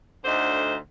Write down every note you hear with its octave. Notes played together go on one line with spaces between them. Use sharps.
D2 D3 D#4 C5